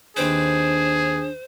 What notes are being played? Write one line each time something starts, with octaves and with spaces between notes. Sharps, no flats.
D#2 C4 D4 G#4 B4 C5